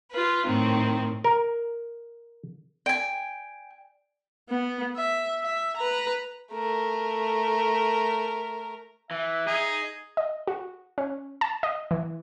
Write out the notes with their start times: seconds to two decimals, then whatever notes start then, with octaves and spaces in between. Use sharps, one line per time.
0.11 F4 B4
0.45 A2 D#3 C4
1.24 A#4
2.86 D5 G5 G#5 D7
4.50 B3
4.96 E5
5.42 E5
5.77 B4 A#5
6.53 A3 A#4
9.11 E3 E5
9.47 D#4 G#4
10.17 D#5
10.48 F#4
10.98 C#4
11.41 A5
11.63 D#5
11.91 E3